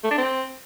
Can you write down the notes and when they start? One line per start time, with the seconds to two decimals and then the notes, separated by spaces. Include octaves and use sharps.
0.04 A3
0.11 D4
0.18 C4